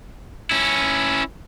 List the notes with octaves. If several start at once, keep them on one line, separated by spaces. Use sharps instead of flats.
C#4 E4